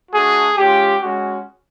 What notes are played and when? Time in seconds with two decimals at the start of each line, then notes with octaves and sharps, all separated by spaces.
0.12 A3 D4 F#4 G#4
0.57 G#3 C#4 F4 G4
1.02 G#3 C#4 F#4